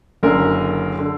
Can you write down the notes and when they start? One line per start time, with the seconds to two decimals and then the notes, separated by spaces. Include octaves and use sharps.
0.23 F#1 F#2 D3 A#4
0.99 D3